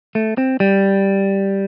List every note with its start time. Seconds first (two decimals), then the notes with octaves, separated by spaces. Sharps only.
0.15 A3
0.38 C4
0.60 G3